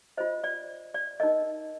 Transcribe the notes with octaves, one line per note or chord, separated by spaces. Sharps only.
F4 C5 D#5
D5
D5
D#4 A#4 D#5